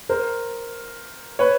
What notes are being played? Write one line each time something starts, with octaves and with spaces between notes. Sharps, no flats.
A#4 C5
B4 C#5